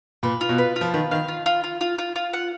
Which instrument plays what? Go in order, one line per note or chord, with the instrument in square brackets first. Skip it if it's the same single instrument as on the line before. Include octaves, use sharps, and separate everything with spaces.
[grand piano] A#2 [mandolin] B4
[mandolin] F4
[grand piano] B2
[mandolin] B4
F4
[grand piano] F3
[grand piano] D#3 [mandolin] B4
[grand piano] D#3 [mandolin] F5
[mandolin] F4
F4
F4
F4
F4
F4
F#5